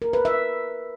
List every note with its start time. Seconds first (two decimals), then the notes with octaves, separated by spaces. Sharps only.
0.02 A#4
0.13 B4
0.25 E5